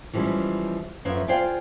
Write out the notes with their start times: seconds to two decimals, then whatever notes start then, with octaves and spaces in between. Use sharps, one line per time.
0.13 E3 F3 G3 G#3 C#4
1.05 F#2 F3 B4 C#5 E5
1.28 F4 C5 D5 F5 G5 G#5